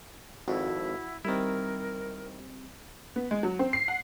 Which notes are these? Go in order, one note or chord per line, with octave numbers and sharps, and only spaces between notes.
G#1 F2 E4 F#4
D#3 G3 C4 E4 A#4
B3
G#3
F#3
C4
C7
F#5